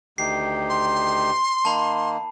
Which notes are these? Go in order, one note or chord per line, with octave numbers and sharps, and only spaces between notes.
D2 D#3 G4 C7
C6
D#3 A#3 A5 B5